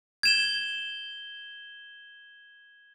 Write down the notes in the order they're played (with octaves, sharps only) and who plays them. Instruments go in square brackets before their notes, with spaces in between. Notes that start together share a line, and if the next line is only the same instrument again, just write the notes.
[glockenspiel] G#6 E7 G7